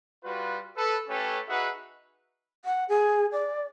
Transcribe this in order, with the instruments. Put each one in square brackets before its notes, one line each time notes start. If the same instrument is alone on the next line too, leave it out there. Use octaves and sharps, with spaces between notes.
[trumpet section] G3 F4 F#4 B4
A4 B4
A3 C#4 G4 A4 B4 C#5
D#4 F#4 G#4 B4 E5 F#5
[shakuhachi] F#5
G#4
D5